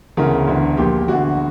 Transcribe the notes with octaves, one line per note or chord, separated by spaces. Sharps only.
E1 D2 C#3 E3 A#4
E1 D2 D3
A#1 A#2 G4
E1 D2 D3 F#4